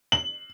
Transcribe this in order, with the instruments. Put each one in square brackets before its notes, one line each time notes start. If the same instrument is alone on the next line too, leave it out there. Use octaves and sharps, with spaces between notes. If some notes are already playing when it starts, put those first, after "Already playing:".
[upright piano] F#7